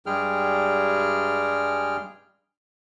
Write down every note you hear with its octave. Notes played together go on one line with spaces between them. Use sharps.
G2 G3 G#3 G#4 G5 F6